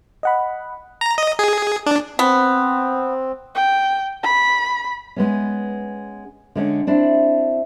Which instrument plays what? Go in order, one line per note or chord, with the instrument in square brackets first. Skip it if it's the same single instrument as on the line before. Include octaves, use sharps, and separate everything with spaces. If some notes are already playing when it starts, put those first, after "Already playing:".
[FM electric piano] D#5 F#5 B5
[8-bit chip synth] A#5
D#5
G#4
D4
[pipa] B3 [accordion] C4
[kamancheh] G5
B5
[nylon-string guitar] G#3 B3 C#4
D3 G#3 C#4
C4 D4 E4